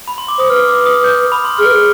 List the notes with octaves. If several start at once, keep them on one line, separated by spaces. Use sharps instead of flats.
B5
C6
D6
C5 D#6
B4 F6
D6
D#6
G6
B5
C6
G#4 F6
B4
G#4